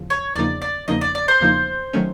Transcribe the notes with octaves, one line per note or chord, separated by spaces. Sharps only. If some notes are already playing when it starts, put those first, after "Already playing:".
Already playing: E2 C#3 F3
C#5
E2 C#3 F3 A#3 D#4 D5
D5
E2 C#3 F3 A#3 D#4 D#5
D5
D5
C5
E2 C#3 F3 A#3 D#4
D#3 F#3 A3 C#4